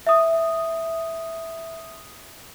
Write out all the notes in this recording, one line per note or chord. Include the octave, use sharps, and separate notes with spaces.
E5 D#6